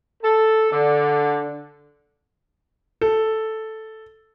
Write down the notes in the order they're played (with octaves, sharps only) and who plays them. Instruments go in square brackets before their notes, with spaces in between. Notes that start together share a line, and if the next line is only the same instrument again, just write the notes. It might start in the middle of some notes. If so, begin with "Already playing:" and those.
[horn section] A4
D3
[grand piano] A4